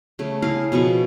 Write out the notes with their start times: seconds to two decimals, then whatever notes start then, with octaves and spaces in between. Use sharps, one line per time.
0.19 C#3 A3
0.42 E4 G#4 A#4 F5
0.72 B2 F3 B3 C#6